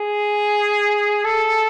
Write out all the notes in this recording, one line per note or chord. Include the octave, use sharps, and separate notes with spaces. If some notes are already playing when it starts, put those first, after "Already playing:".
Already playing: G#4
A4